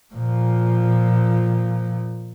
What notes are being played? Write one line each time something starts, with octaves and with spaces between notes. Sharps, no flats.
A#2 F3